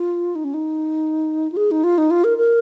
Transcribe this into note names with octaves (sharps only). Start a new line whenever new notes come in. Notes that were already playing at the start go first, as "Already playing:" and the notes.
Already playing: F4
D#4
C#4
D#4
F4
G#4
D#4
F4
D#4
F4
A#4
A#4